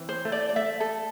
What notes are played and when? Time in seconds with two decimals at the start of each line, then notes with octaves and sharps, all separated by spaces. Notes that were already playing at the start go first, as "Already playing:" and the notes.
Already playing: E3 C4
0.09 C5
0.25 A3
0.32 D5
0.49 D5
0.56 A3 E5
0.80 A4